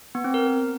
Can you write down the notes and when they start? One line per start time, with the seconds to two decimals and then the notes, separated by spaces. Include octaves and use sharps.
0.15 B3
0.24 C4
0.34 A#4